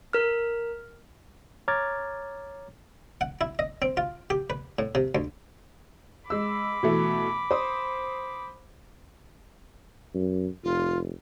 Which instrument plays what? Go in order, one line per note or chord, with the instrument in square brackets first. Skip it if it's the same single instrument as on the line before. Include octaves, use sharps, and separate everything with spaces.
[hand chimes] A#4 F6
[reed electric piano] C#5 A#5 D6 F6 G#6 A6
[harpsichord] F#5
E4
D#5
C4
F4
G4
B4
A2
C3
D2
[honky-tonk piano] G#3 E6 [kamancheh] B5 D6
[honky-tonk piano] B2 E3 A3
C5 D#6
[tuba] F#2
[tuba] F1 [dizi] F4